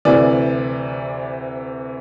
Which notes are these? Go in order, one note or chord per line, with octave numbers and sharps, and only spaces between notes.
D2 C3 E3 D5